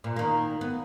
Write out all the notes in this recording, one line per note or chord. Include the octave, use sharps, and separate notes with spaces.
A#2
D#3 A#3
B3